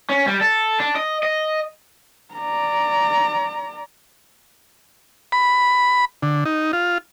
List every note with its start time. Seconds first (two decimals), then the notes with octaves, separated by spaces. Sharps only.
0.09 C#4
0.27 G3
0.41 A4
0.80 D4
0.96 D#5
1.23 D#5
2.34 D5 A#5
5.32 B5
6.22 D3
6.45 D#4
6.73 F4